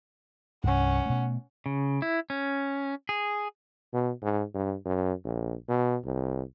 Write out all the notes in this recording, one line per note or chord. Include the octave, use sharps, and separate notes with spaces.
C2 G2 C#4 F#5
B2 A3
C#3
E4
C#4
G#4
B2
G#2
G2
F#2
A#1
B2
C2